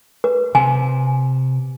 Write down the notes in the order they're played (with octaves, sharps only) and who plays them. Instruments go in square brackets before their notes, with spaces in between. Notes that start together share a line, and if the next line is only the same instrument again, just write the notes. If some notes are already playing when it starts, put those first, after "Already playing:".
[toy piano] B4
[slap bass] C3 [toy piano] G#5